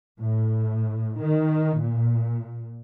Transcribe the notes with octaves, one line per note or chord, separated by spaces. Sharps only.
A2
D#3
A#2